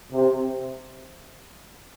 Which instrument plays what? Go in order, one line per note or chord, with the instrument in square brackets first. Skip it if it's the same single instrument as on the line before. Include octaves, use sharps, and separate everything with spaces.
[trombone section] C3